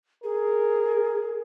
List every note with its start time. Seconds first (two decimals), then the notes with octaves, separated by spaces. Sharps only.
0.24 G#4 A#4